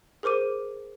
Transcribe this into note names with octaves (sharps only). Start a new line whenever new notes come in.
G#4 A#4 C5 D6 D#7